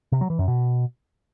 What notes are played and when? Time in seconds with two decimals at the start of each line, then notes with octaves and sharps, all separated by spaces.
0.12 C3
0.21 F#3
0.30 E3
0.39 F#2
0.48 B2